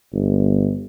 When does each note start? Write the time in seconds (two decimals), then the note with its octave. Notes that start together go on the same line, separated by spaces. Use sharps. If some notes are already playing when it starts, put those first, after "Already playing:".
0.13 G1